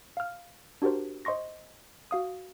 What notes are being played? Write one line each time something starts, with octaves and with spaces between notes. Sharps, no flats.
F5 F6
D4 F#4 G4 A#4 C5
C5 D#5 C6 C#6 A#6
F#4 F5 D#6